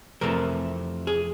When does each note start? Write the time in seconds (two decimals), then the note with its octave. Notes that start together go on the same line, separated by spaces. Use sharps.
0.21 F2 C3 E3 A3 A#4
1.07 G#4